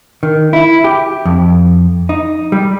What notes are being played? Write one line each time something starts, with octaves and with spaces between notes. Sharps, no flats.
D#3
E4
G4
F2
D#4
G3